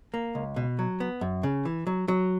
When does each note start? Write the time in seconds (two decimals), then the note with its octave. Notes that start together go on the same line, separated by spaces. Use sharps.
0.14 A#3
0.35 C#2
0.56 B2
0.79 F#3
1.00 B3
1.21 F#2
1.43 C#3
1.65 E3
1.87 F#3
2.08 F#3